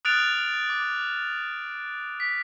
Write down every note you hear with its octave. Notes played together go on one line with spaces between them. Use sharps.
D#6 F6 F#6 A6 D7 F7
D6
B6